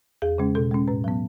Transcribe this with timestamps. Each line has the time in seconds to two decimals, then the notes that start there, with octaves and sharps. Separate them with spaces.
0.22 E2 G#4
0.38 C#3 G#3 C#4
0.55 B2 A4
0.71 G#3 C#4
0.87 A2 B4
1.04 F#3 B3